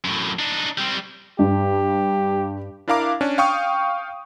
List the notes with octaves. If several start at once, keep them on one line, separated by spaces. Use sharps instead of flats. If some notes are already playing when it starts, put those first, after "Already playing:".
F#2 A2
D4 D#4
G3 C4
G2 G4
D4 E4 A#4 F5 A#5 D6
C#4 D4
F5 G5 C#6 D#6